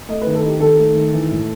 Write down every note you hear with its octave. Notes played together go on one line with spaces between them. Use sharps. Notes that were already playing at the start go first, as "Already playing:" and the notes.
A3 D#5
B4
D#3
A4
D#4 G4
D#3 A4
A3
D#3
E3
A2